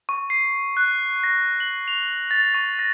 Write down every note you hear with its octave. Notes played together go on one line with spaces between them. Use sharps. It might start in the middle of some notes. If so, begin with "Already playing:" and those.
C#6
C7
F#6
A#6
F#7
F7
A6
C#6
A#6